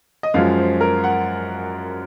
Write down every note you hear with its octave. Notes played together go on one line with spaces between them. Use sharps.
D#5
F#2 F3 G#3 F5
C5
A#4
F#5